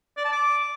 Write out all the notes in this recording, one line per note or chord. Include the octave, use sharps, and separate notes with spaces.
D5
A5
D6